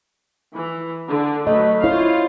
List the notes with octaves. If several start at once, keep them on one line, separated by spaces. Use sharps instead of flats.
E3
D3
F#3 A3 B4 D#5
E4 F4 C5 C#5 F5